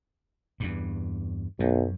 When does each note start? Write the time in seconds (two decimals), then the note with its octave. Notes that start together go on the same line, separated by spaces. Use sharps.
0.60 E2 G2
1.60 B1 F#2